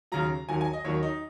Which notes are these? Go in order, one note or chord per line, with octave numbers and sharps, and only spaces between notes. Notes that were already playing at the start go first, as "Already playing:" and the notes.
D#2 C#3 F#3 A#5
D#2 D#3 F#3 G#5
G#5
D#5
D#2 D#3 F#3 C#5
D#4